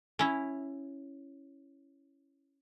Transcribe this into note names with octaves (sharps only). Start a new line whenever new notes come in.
C#4 E4